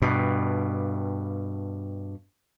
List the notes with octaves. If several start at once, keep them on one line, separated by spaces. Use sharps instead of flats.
G2 B2